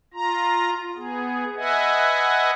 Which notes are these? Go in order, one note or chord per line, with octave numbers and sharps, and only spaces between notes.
F4 A#5
B3 G#4
B4 D#5 E5 F#5 G#5